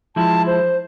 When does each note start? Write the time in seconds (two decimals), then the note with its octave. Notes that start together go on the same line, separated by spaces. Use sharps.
0.16 F3 G#3 E4 A5
0.47 C5